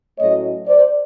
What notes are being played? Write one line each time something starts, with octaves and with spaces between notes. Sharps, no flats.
A2 F#3 A3 C#4 C#5 D#5
C5 D5